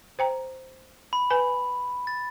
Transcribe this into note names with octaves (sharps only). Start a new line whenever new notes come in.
C5 G5 A#5
B5
B4 G#5
A6